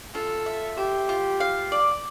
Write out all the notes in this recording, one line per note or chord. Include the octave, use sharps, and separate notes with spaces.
F4 A4
E5
G4 C5
F4
F5
D5